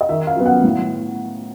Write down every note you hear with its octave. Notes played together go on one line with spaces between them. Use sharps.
D#5
D#3 E5
F5
F#3 B3
F#5
A2